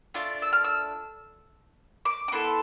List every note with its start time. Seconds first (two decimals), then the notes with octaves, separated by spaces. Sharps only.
0.14 A3 D4 F4
0.42 E6
0.53 F6
0.64 E6
2.05 D6
2.28 D6
2.32 B3 E4 A4 C6